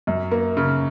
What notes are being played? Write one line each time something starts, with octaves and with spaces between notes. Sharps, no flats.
F#2
A#3
C#3